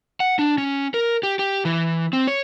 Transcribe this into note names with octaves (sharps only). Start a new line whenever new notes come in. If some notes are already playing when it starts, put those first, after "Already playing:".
F#5
D4
C#4
A#4
G4
G4
E3
C4
C#5